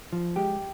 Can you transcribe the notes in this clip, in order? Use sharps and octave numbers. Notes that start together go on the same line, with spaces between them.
F3
G#3 G4